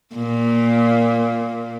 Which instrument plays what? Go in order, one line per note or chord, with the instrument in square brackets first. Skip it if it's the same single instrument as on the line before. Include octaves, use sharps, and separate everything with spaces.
[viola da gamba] A#2